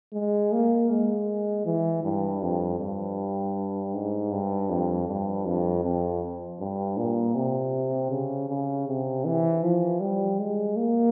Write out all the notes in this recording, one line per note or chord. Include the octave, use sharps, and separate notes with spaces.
G#3
A#3
G#3
E3
G2
F2
G2
G#2
G2
F2
G2
F2
F2
G2
A#2
C3
C#3
C#3
C3
E3
F3
G3
G#3
A#3